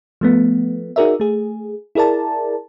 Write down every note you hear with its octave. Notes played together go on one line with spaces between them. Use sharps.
F3 A3 B3
D#4 F#4 G#4 A#4 D5 E5
A3 G#4
E4 G#4 A#4 D5 A5